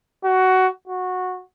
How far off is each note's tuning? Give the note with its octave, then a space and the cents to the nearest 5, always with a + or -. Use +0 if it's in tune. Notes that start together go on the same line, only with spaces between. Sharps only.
F#4 +15
F#4 -15